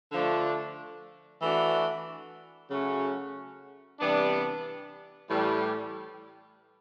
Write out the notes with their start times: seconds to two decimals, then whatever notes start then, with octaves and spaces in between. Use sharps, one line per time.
0.11 D3 F3 A3 D4
1.41 E3 A3 D4 F#4
2.71 C#3 F#3 A3 C#4 F#4
4.00 C3 E3 G3 B3 D4
5.29 A2 E3 G3